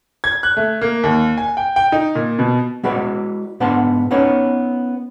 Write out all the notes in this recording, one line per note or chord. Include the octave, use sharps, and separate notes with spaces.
G#6
F#6
A3
A#3
D#2
G#5
G5
G5
D#4
A#2
B2
G#3 E4 F#4 B4 D5
G#2 B3 D4 F#5 A5 C6
B3 C#4 D#4 B4 C#5